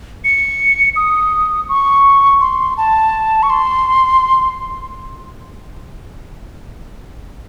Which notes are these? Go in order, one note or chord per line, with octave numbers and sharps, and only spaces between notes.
C#7
D#6
C#6
C6
A5
C#6
C6